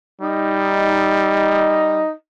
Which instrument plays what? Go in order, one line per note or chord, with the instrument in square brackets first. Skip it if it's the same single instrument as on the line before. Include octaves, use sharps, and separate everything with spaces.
[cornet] G3 [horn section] D#4